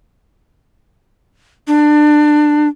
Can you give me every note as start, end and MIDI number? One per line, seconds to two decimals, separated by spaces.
1.67 2.68 62